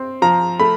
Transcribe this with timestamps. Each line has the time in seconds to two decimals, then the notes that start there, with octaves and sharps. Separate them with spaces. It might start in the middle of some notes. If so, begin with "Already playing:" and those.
Already playing: C4
0.22 F3 A#5
0.60 A3 B5